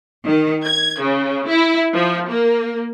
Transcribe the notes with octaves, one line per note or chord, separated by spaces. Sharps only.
D#3
G#6
C#3
E4
F3
A#3